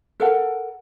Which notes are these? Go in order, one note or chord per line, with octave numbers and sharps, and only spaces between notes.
A4 A#4 F#5